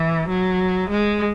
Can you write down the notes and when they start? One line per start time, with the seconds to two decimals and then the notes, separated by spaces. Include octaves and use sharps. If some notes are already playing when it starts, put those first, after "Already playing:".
Already playing: E3
0.29 F#3
0.90 G#3